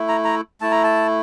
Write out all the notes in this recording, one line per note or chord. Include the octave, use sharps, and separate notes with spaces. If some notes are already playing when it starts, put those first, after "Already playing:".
Already playing: A3 E4
A#5
A#5
A3 E4 A5
A#5
A5